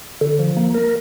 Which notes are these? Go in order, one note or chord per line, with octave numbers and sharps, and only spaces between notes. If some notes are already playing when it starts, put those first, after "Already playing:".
D3
F3
A#3
A#4